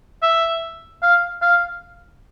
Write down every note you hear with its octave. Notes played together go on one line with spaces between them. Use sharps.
E5
F5
F5